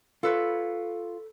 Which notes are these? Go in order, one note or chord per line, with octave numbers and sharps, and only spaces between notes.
F4 A4 B4 C#5